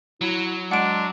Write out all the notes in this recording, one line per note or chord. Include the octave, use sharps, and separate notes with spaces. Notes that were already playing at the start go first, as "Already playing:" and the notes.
F#3 E4
G#3 D4 F#5 D7